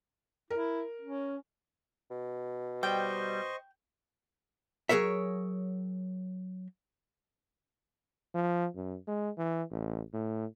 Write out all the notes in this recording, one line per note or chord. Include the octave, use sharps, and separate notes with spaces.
E4 A#4
C#4
B2
G3 C5 D#5 G5 C#6
F#3 G#4 A#4 C#5 E5
F3
F#2
G#3
E3
A1
A2